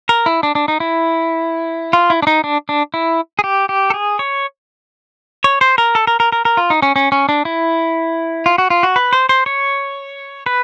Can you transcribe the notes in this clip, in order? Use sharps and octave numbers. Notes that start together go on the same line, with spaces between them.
A#4
E4
D4
D4
D#4
E4
F4
E4
D4
D#4
D4
D4
E4
G#4
G4
G4
A4
G#4
C#5
C#5
C5
A#4
A4
A#4
A#4
A#4
A#4
F4
D#4
C#4
C#4
C#4
D4
E4
F4
F#4
F4
F#4
B4
C5
C5
C#5
B4